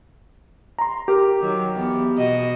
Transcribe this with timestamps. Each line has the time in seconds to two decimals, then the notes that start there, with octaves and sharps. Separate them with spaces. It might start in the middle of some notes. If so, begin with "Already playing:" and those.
0.79 A#5 C6
1.08 G4 A#4
1.40 D#3 F#3
1.75 E2 B3
2.16 B2 F#4 D#5